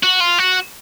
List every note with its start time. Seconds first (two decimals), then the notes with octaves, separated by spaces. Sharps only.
0.03 F#4
0.20 F4
0.38 F#4